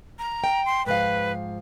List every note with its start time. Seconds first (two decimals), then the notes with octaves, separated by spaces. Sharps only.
0.19 A#5
0.44 G5
0.65 C6
0.86 G#2 F3 B4 F5